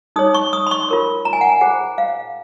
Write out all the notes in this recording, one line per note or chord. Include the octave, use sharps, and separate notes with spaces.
D#4 G#4 C#5 D#6
C#6
D#6
C6
C#6
F4 A#4 C#5
A#5
G#5
F#5
G#5
F4 G#4 C5 F#5
F5